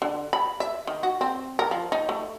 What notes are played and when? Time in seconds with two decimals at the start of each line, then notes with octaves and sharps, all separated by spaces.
0.02 D3
0.33 B5
0.60 E5
0.87 D#3
1.03 F#4
1.21 C4
1.59 A#4
1.71 F3
1.92 D#4
2.09 A3